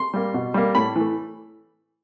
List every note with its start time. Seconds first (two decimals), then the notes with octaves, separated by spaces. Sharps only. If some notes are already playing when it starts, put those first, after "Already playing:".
Already playing: C6
0.14 G3 A#3
0.34 B2
0.54 G3 A#3
0.75 A2 B5
0.95 E3 A3